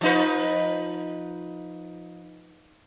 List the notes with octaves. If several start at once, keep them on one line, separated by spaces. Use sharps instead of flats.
F3 D#4 B4